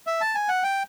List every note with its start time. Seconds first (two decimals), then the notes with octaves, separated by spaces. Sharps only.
0.07 E5
0.21 A5
0.35 G#5
0.49 F#5
0.63 G5